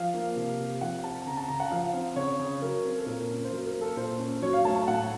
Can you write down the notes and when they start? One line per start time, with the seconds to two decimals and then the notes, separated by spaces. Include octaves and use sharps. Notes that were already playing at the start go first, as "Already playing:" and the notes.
Already playing: F3 F5
0.14 A#3
0.36 C3
0.59 C3
0.81 F3 F#5
1.03 C4 A5
1.27 C#3 A#5
1.37 A5
1.48 C#3 A#5
1.60 F#5
1.71 F3 F5
1.93 C4
2.16 C#3 C#5
2.39 C#3
2.62 F#3 A#4
2.85 C4
2.98 A4
3.06 A#2 A#4
3.30 C#4
3.44 C5
3.52 F#3 A#4
3.66 A#4
3.74 A#3
3.81 A4
3.97 A#2 C5
4.19 C#4
4.42 F#3 C#5
4.53 F5
4.65 A3 A5
4.76 A5
4.87 A2 F#5